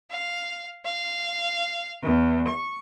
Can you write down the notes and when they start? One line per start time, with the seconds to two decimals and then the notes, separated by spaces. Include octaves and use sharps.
0.10 F5
0.85 F5
2.02 E2
2.47 C#6